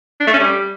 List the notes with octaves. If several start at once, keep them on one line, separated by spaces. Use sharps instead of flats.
D4
A3
C#4
G3